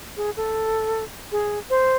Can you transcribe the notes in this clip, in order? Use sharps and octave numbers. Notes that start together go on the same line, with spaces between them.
G#4
A4
G#4
C5